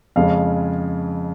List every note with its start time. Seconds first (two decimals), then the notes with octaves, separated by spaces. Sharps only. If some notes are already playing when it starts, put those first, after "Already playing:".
0.16 F2 C#3 G#3 C#4 F5